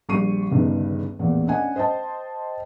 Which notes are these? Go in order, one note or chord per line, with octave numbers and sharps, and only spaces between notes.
A#1 G3 C#6 C7 D#7
G1 C#2 G2 D#3
A1 E2 A#2
C#4 D4 D#5 F#5 G#5
C5 D#5 G5 A5